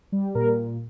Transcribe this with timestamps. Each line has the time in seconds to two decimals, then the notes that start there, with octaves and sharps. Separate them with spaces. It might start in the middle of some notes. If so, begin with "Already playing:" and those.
0.12 G3
0.35 A#2 A#4